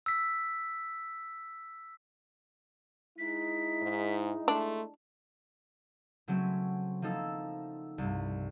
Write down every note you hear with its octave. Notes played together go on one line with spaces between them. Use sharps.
E6 B6
G#3 D#4 E4 B6
G#2
A3 D4 C6
C#3 F#3 A3 C4 C#4
F3 A#3 D#4 A4 E6
C2 G2